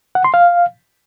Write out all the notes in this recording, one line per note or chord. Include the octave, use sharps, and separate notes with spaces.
F#5
C6
F5